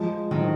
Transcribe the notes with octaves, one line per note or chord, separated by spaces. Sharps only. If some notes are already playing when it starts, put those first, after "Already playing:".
Already playing: F3 G#3
D#3 F#3 C4